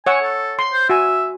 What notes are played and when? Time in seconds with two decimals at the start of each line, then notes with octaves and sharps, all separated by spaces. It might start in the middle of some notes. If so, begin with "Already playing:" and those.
0.06 C#5 F#5 G#5 E6
0.22 A4
0.59 C6
0.73 C5
0.90 F#4 E5 G#5